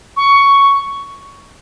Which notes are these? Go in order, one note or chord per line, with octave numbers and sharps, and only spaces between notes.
C#6